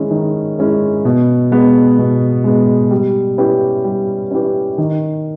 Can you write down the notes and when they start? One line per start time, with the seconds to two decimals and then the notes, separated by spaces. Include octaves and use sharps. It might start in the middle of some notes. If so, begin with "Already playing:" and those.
Already playing: D#3 G#3 C#4 E4
0.11 D#3
0.59 G#3 C#4 E4
1.05 B2
1.51 G#3 B3
1.99 B2
2.44 G#3 B3
2.91 G3
3.38 C#4 E4 G4 B4
3.84 G3
4.31 C#4 E4 G4 B4
4.78 D#3